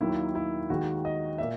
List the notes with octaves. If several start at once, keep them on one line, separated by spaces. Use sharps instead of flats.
D#2 D#3 F#3 A#3 E4
E4
D#2 D#3 G#3 F#4
D#5
A#2 A#3 E5